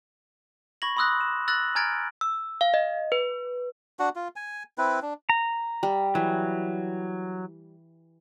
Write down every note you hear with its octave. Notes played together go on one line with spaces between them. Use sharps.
B5 C#6 G#6 A#6 F#7
B5 C6 D#6 E6 F#6 A#6
E7
E6 F#6 A6 A#6 F#7
G#5 A#5 F6 G#6 A6 D7
E6
F5
D#5
B4
D4 F#4 F#5
F4
G#5
C4 E4 B4
D4
A#5
G3
E3 F#3